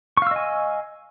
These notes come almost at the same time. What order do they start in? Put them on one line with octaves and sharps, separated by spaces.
C#6 F5 E6 D#5 G#5